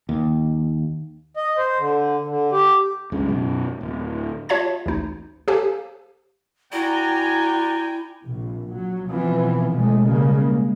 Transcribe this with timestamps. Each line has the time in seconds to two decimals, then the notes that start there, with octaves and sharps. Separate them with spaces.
0.09 D#2
1.37 D#5
1.58 C5
1.78 D3
2.28 D3
2.52 G4
3.12 C#2 G2 C#3
3.28 F#2 B2
3.81 D1
4.49 F4 C#5 E5 A5 G#6
4.86 A1 D2 D#4
5.48 G4 A4 C5 F5 G#5
6.73 E4 F#4 D5 G5 G#5 A#5
8.24 A#1 C3
8.70 F#3
9.10 B2 E3 F3 B3 C4
9.74 B1 A#2 G#3 A3
10.06 C#3 G3 G#3 A#3
10.42 G#3